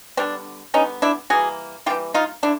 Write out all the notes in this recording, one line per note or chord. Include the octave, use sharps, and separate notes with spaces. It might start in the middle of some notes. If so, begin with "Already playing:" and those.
D3 G3 B3 C4 D4
D3 G3 B3 C#4 D#4
D4 E4
E3 G3 A#3 F#4 G#4
E3 G3 A#3 F4 G4
D#4 F4
D3 D4 E4